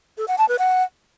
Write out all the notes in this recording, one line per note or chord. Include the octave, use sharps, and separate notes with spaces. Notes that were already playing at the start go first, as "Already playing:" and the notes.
A4
F#5
A5
B4
F#5